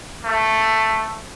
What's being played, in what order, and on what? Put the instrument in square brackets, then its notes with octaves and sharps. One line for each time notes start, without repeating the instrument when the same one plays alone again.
[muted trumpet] A3